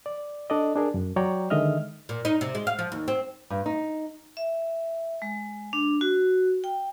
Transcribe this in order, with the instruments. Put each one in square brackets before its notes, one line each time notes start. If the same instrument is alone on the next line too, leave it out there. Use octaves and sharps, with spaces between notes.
[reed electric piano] D5
D4 A4 D5 D#5
D4 G#4 A#4
F#2
F#3 C#5 D5 G5 A#5
D3 D#3 G#3 D#5 E5 F6
[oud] A#2
D#4
C3
G#3
F5
F3
D#2
C4
[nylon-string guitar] G2
D#4
[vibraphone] E5
G#3
D4
F#4
G5